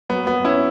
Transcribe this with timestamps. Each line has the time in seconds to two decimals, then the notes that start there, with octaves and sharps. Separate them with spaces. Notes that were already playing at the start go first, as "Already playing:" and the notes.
0.09 F#3 B3
0.27 B3
0.36 F#3
0.45 C#4 E4